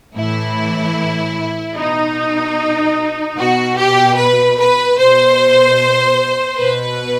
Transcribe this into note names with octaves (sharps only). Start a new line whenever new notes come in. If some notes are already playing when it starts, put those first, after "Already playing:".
A2 E3 E4
B2 D#4
B2 F#4
G4
B4
B4
B2 C5
B2 B4